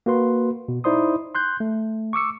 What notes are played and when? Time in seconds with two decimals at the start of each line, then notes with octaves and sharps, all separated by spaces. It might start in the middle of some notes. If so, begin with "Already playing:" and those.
0.06 A#3 F#4 B4 C6
0.68 B2
0.84 D#4 E4 C5 D5 C6 D#6
1.35 C6 F#6 G6
1.60 A3
2.13 C#6 D6 E6 C#7